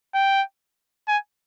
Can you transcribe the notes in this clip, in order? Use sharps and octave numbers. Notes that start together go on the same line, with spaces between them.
G5
G#5